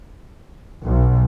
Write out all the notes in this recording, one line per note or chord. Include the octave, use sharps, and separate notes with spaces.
B1